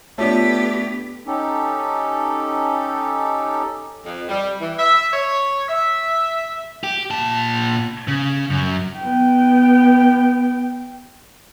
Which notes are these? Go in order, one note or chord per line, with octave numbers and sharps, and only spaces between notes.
A3 B3 D4 F4 G4 C#5
C#4 D#4 G4 A4
F2
G3
E3
E5
C#5
E5
G4
A#2 A5
C#3
F#2
B3 G5